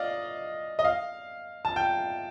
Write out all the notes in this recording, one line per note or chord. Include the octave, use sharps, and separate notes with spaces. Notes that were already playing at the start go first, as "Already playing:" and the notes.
Already playing: D5 D#5 F5
D#5
F5
A5
G5